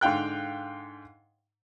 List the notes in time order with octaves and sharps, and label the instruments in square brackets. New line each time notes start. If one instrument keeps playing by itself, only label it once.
[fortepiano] G#2 D3 F5 G5 F#6